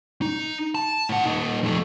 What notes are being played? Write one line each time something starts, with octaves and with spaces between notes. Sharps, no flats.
D#4
A5
A2 F#5
A#2 D#4
F2 A3